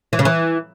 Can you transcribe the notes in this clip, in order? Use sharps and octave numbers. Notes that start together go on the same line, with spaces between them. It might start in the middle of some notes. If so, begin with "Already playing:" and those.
E3
C#3
E3